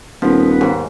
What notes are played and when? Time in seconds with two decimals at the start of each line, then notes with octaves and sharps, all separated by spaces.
0.22 D#1 F3 B3
0.61 D#2 G#2